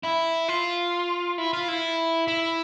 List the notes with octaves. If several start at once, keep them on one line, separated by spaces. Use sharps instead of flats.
E4
F4
E4
F4
E4
E4